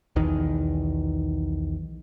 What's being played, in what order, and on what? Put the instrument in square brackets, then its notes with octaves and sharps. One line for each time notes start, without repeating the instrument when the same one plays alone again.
[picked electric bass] B1 E2 D#3 E3